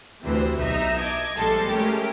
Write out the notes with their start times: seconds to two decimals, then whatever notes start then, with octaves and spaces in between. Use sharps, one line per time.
0.23 D2 C3 E3 C5
0.59 B1 D#4 E5 A#5 E6
0.99 D#5 A5 D6 G#6
1.36 A#1 G3 G#3 A4 C6 A6
1.70 G#3 A3 C#4 G4 A#4